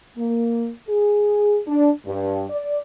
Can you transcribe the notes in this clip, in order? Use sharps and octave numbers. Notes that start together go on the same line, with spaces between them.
A#3
G#4
D4
G2
D5